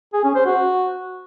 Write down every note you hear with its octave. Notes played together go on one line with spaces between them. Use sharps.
G#4
C#4
C5
F#4